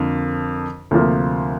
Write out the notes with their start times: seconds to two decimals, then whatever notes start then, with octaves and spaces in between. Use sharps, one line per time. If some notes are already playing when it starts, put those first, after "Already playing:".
Already playing: F2 D3 F3 A#3
0.91 D2 C3 F3 A#3